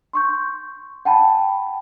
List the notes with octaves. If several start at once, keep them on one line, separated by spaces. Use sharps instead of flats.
C6 C#6 G6
F#5 G5 A5 B5